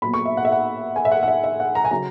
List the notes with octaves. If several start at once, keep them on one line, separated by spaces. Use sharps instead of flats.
A#2 F#3 B3 B5
C#6
E5
F#5
E5
F#5
G#5
E5
F#5
F#5
E5
E5
F#5
A#5
G#5
C#3 F#3 A#5